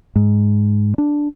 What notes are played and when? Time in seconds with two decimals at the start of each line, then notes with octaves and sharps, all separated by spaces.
0.16 G#2
0.98 D4